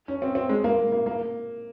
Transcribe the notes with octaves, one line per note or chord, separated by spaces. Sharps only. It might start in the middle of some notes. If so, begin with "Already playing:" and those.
C#4
C4
C4
G#3
A#3
A#3
A#3